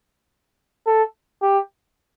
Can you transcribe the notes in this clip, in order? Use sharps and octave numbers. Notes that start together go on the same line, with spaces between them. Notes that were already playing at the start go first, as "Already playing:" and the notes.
A4
G4